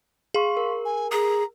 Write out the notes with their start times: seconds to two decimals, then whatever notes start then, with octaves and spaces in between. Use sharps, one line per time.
0.34 G#4 F5 C6 C#6
0.57 A#4
0.85 G#5
1.12 G#4 A#5